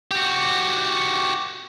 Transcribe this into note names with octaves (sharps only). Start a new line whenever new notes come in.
F#4 G4